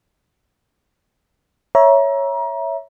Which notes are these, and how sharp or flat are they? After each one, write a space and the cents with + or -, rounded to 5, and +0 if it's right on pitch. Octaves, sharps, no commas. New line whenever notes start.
C#5 +0 E5 +0 A#5 +30